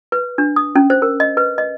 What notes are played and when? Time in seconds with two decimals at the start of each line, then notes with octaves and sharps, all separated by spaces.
0.12 B4
0.38 D4
0.56 D#6
0.75 C#4
0.90 C5
1.02 A#4
1.20 D#5
1.37 B4
1.58 D#5